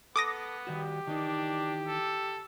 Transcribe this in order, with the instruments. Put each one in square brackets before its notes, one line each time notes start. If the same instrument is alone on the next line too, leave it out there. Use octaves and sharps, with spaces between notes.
[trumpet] B3 [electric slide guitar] A4 [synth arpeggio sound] D6 D#6 A#6
[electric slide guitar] D#3 G3 F#4 [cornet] G4
[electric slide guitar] D#3 E3 D#4 [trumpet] D4
[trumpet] A4